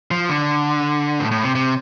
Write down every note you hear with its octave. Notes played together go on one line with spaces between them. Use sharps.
F3
D3
A2
A2
C3
C3